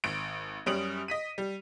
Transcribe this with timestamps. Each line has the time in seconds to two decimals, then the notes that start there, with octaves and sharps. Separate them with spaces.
0.04 G#1 D7
0.66 F#2 G3 C#4 D#6 D7 F#7
1.08 D#5 B6 D#7
1.38 G3